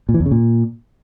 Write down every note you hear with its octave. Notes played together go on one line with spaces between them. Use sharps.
A#2
E3
E2
C#3
A#2